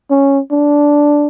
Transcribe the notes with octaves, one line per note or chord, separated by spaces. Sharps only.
C#4
D4